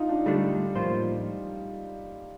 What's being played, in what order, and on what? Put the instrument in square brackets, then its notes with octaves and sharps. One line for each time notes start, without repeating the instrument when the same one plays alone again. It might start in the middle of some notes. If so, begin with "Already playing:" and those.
Already playing: [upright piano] D#4 F4
D4
[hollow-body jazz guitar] D3 A3 D4 [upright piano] G3
[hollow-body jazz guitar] A2 F3 A#3 F4 C5